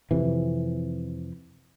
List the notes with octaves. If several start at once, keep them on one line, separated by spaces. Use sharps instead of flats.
F2 C3 E3